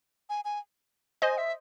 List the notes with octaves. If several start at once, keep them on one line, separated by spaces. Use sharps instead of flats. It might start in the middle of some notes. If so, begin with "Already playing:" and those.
G#5
G#5
C5 D#5 G#5
E5